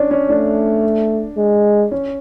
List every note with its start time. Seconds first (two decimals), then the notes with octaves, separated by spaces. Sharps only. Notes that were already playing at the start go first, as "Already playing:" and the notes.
Already playing: C#4 D4
0.11 C#4
0.29 A3 D4
1.37 G#3
1.91 C#4